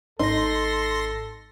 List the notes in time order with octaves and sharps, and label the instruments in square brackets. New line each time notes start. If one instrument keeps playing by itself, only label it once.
[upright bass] G#1 [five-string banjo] D#4 [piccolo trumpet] A4 [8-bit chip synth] C6 A#6